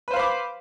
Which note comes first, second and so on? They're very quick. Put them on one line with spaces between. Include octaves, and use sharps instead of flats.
B4 C5 F5 B5 D6